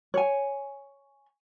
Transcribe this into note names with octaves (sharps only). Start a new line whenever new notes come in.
C#5 G#5